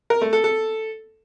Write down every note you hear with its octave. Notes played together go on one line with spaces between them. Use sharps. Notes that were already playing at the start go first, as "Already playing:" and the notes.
A#4
A3
A4
A4